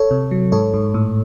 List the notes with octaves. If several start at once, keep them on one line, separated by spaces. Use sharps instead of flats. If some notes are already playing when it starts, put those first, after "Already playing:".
Already playing: A4 C#5
C3
F#3
G#2 A4 C#5
G#2
A2